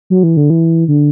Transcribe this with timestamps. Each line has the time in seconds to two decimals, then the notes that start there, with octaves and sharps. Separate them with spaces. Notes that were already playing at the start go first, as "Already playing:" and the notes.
0.10 F#3
0.23 E3
0.37 D3
0.50 E3
0.88 D3